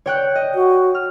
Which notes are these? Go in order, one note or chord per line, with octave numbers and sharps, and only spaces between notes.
C#5 G5 F#6
D#5
F#4
F6